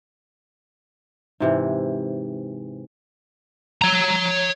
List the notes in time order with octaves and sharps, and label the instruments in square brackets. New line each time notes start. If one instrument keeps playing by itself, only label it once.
[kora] G#2 C3 E3
[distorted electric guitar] C#5 A#5